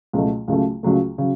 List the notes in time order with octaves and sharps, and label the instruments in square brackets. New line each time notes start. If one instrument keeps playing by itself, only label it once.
[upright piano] C#2 B2 F#3 A3
C#2 C#3 F#3 A3
C#2 C#3 F#3 A3
C#3 F#3